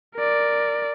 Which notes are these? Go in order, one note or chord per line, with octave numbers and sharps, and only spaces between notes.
A#4 D5